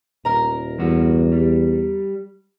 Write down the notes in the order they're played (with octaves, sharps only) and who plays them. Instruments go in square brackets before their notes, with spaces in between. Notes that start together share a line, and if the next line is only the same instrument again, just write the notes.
[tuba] D#1 [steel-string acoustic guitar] A#4 A#5
[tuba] E2 [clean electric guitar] G2 F#4
[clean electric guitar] G3